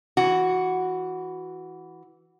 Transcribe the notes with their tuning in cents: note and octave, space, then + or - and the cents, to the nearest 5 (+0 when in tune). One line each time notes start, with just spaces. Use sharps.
E3 +0 F#4 +0